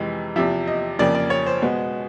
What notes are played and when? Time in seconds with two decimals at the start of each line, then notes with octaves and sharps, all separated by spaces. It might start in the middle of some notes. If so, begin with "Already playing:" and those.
Already playing: F2 C3 E3 G#3
0.36 E2 C3 F3 E5
0.67 D#5
0.99 F2 C#3 F3 A#3 D5
1.15 D5
1.30 C#5
1.46 C5
1.62 B2 G#3 B3